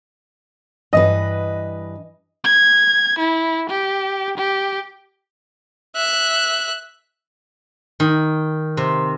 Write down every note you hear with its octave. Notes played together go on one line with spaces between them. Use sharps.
G2 E3 B4 D#5
G#6
E4
G4
G4
E5 F#6
D#3
C3